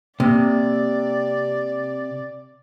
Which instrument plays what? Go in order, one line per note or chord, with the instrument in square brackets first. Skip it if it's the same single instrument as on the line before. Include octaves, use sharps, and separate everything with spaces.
[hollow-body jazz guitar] C3 [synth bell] A#3 [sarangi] D5